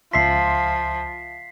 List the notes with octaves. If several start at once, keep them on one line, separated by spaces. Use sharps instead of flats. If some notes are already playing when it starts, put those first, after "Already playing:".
C#2 F3 E5 C6 B6 C7